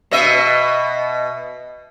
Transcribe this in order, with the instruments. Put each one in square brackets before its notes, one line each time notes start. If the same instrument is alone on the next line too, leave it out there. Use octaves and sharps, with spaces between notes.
[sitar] B2 D#5 E5